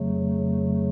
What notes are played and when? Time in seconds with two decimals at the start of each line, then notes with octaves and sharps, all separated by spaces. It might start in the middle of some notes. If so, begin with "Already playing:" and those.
Already playing: F2 C#3 F#3 A3